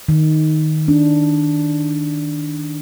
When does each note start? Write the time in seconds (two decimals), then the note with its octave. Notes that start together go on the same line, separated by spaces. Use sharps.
0.09 D#3
0.88 D4